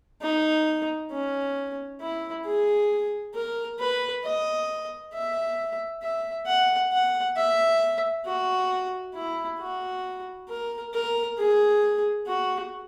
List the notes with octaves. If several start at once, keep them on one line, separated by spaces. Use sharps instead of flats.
D#4
C#4
E4
G#4
A#4
B4
D#5
E5
E5
F#5
F#5
E5
F#4
E4
F#4
A#4
A#4
G#4
F#4